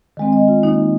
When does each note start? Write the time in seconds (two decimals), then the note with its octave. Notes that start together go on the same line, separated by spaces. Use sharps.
0.17 D#3 G#3 C4
0.33 D#5
0.48 F4
0.63 D#3 A#3 D#4